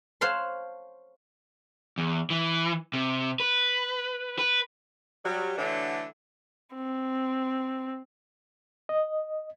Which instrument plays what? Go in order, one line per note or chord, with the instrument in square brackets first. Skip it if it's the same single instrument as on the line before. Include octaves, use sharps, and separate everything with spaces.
[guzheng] C5 C#5 F5 F#5 A5 C6
[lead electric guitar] E2
E3
C3
B4
B4
[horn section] F#3 G3
D3 E3 F#3 A3 D4
[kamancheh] C4
[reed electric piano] D#5